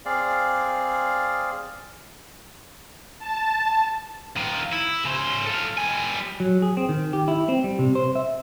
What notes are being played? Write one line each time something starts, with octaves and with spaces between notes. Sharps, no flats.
C4 G#4 D5 F5
A5
D#3 F4
E4
C#3 C5
A4 F5
G3 G#5
F#3
G#4
C4
D#3
G4
E4
C4
G3
C3
C5
E5